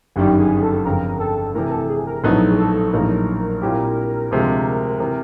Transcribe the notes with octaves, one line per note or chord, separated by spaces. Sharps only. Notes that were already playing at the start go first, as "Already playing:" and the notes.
G1 F#2 D#3 G3 G4
G#4
A4
G1 F2 C#3 A#4
A4
C3 E3 A3 A#4
A4
G#4
A#4
A#1 A2 F#3 B3 D#4 A4
G#4
A4
A#1 A2 F#3 A#3 D#4 A#4
A#2 G3 C4 E4 G4
D2 C3 F3 G#3
C3 E3